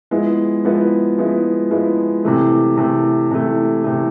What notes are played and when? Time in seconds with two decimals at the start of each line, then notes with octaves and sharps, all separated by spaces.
0.11 F3 G#3 B3 E4
0.64 F3 G#3 B3 E4
1.18 F3 G#3 B3 E4
1.71 F3 G#3 B3 E4
2.25 C3 E3 A3
2.77 C3 E3 A3
3.31 C3 E3 A3
3.84 C3 E3 A3